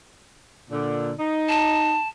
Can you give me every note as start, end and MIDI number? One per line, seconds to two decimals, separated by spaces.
0.70 1.13 46
0.70 1.13 50
1.19 1.97 63
1.49 2.08 81